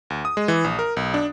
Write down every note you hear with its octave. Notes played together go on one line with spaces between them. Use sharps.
D2
D#6
G#3
E3
A#1
A#4
B1
D4